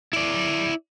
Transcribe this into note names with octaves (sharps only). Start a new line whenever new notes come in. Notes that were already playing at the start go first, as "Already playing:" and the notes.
E4 D5